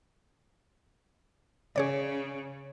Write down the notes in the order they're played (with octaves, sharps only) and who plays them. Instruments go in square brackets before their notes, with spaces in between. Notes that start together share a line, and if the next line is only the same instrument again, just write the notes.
[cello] C#3 [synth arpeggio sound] G#4 C#5 D5